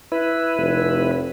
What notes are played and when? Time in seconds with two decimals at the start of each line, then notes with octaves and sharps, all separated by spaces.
0.12 E4 B4
0.57 F1